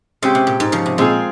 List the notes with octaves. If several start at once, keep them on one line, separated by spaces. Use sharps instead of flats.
C#3 G#3 C4 G4
C3
A#2
G#2
C#3 F3
C3
A#2 G#3 C4 F4 G#4